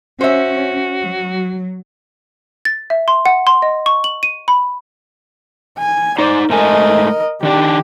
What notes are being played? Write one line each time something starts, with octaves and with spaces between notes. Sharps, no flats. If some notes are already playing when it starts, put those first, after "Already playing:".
C#4 F#4 C5 E5
F#3
A6
E5
C6
F#5
C6
D#5
C#6
F#7
D#7
B5
G#5
D#4 C5 D5
G#2 A3 A#4 D#5 G#5
D#3 D4 G4 D5